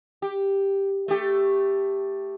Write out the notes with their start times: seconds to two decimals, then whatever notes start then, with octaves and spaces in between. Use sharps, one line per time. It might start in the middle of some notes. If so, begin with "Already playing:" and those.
0.22 G4
1.08 A3 G4